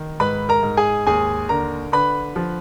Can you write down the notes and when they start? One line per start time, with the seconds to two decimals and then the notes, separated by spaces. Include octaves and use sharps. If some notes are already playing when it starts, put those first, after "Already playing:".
Already playing: D#3
0.20 G#2 B4 B5
0.49 A#4 A#5
0.63 G#2
0.77 G#4 G#5
1.07 D#2 G#4 G#5
1.49 D3 A#4 A#5
1.92 D3 B4 B5
2.36 F3